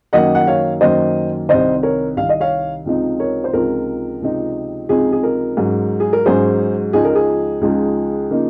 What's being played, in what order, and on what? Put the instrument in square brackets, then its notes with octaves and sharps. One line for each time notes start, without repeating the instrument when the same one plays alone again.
[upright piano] F#2 D#3 F#3 A#3 D#5 F#5
F#5
C#5 F5
F#2 D#3 F#3 A#3 C5 D#5
C2 C3 D#3 C5 D#5
A#4 C#5
C2 C3 D#3 F5
D#5
C#5 F5
C#2 C3 F3 C4 D#4
A#4 C#5
C5
C#2 C3 F3 C4 D#4 A#4
C#2 C3 F3 C4 D#4
C#2 C3 F3 C4 D#4 G#4
G#4
A#4
G#2 F#3 C#4
G#4
A#4
G#2 F#3 C#4 G#4 C5
C#2 C#3 F3 G#3 D#4 G#4
A#4
G#4
C#2 C#3 F3 G#3 D#4
C#3 F3 A#3 D#4